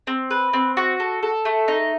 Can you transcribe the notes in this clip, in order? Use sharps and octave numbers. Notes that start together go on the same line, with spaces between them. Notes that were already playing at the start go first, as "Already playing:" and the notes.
C4
B4
C4
F#4
A4
A4
A3
D#4